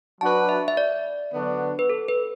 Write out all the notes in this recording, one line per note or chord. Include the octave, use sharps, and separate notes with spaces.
F#3 D4 F#4 B4 A5
E5
E5
D5
D3 F#3 B3 D4 F#4
B4
A4
B4